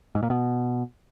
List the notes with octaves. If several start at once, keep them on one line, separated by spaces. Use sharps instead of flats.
G#2
A#2
B2